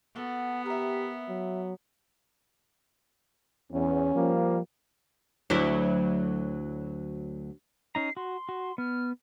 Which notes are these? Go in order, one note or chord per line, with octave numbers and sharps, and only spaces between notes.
B3 F#4 A4 F#5
G4 A#4 E5
F#3
E2 C#4
F3 G3 A#3
D2 F#3 E4
C#4 D#4 A#5 C7
F#4 C6
F#4
B3 F6